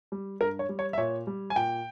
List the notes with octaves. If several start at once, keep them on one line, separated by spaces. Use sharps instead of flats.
G3
G2 A#4
C#5
G3
C#5
E5
A#2 C#5
G3
G#5
A#2 G5